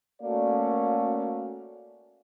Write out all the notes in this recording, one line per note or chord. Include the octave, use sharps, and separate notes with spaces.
A3 A#3 C#4 F#4 D5 F5